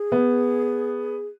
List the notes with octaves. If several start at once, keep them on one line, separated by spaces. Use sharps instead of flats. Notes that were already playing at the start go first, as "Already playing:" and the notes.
Already playing: G#4
B3